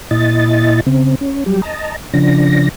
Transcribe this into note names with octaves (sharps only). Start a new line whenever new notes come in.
A#2 E4 D#5 A6
C#3 C4
C#4
F#3 G3 G4
D#5 A5 A#5
C#3 F3 D4 A#6